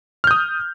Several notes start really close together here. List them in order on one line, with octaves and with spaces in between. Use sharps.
F6 G6 D#6